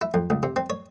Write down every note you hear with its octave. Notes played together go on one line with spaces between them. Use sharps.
E4
F2
C#2
C3
C4
C#5